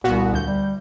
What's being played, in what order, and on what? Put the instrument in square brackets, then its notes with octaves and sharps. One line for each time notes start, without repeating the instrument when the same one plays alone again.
[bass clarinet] C2 [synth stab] A#2 B3 F#4
[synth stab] D2 G6
[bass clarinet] G3